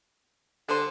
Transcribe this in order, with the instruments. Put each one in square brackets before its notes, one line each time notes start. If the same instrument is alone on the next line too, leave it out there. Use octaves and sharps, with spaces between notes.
[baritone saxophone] D3 [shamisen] G3 C5